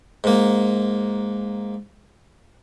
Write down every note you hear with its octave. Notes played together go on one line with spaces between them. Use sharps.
G#2 A#3